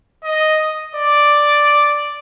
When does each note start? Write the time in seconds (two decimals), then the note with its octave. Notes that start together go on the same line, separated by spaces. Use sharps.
0.24 D#5
0.96 D5